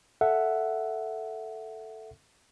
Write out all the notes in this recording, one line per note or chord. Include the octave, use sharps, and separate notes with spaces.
A4 E5 F#5